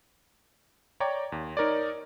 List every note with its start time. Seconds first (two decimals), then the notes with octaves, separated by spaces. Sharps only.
1.00 C#5 D5 G5 A#5 D6
1.32 D#2
1.57 D#4 A#4 C#5 D5